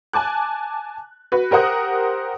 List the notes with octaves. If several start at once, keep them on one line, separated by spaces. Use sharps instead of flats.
G#5 A5 D6 F#6
F#4 B4
G4 A#4 C5 F#5 D#6 F#6